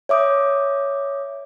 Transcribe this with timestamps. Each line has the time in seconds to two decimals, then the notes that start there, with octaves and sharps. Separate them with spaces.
0.09 C#5 E5 D6 D#6 G6